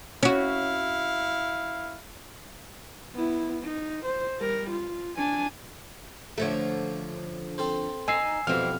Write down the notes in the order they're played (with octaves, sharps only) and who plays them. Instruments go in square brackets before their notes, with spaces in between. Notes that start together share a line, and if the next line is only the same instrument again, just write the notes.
[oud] C#4 F#4 [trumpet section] E4 F5
[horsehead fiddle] B3 E4
D#4
C5
G3 A#4
F4
D4 G#5
[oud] D3 F3 A3 [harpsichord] C#5 E5
[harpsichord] C4 A4 C5
[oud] D#4 [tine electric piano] G#5 E6 C7
[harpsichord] F2 B2 G3 [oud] E3 C4 [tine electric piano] F6